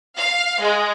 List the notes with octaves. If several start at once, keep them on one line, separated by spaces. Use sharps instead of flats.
F5
G#3